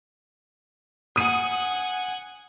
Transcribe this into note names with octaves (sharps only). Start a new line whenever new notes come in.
F#5 G#5 D#6 D#7